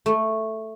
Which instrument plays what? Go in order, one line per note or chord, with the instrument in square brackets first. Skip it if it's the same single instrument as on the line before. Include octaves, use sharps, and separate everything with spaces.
[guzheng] A3